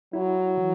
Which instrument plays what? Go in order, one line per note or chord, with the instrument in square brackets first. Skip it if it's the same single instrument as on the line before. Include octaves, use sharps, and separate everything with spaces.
[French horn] F#3 [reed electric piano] E4
[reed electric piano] E3